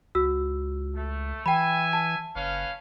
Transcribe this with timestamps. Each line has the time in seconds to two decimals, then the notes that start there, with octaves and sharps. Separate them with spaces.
0.15 C#2 F#4 E6
0.94 A3
1.46 E3 E5 G5 G#5 B5
1.93 A5
2.35 F#1 C#4 B4 F5